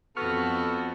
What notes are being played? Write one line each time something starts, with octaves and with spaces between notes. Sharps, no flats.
F2 B3 F#4 A4 C#6 F6